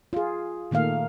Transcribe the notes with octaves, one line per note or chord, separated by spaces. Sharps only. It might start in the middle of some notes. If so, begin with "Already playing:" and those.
F4 G#4
A#2 D#3 A3 A#3 F5